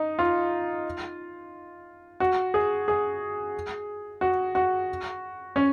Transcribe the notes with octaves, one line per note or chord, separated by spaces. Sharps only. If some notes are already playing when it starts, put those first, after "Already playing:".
Already playing: D#4
F4
F#4
G#4
G#4
F#4
F#4
C#4